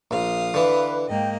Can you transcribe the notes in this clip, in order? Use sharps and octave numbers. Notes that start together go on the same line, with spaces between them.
A#1 F5 D#6
D3 E3 B4
G#2 A#3 D#5 G5